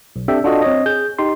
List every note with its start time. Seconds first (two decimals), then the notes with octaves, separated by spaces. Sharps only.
0.16 B1
0.28 C4 D4 G4 A4 E5 G5
0.44 D4 F4 F#4 A4 D#5
0.62 C4 C#5 D#5
0.86 G#4 G6
1.19 D#4 G4 C6